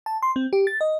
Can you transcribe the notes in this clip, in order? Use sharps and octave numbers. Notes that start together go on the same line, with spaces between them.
A5
C6
C4
G4
A6
D#5